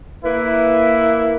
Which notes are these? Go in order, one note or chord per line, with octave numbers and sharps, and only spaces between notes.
A#3 E4 B4